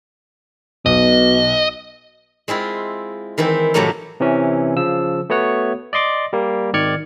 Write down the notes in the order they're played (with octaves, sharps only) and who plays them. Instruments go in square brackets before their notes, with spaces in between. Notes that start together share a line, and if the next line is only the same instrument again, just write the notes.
[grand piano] B1 [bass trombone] B2 [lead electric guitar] D#5
[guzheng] G#3 C4 E4 F4
D#3 E3 C4 E4
A2 C3 F3 F#3 A3 A#3
[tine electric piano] C3 E3 C#4
C#3 F3 E6
A3 B3 F#4 C#5 F#5
D5 D#5 C6 D6
G3 A#3
G#1 D#3 D5 F6 G#6 C#7